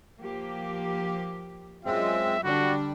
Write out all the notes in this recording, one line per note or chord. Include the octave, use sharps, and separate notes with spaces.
F3 A#3 G4
F#2 G#3 C4 F4 E5
D3 G3 D4 F#4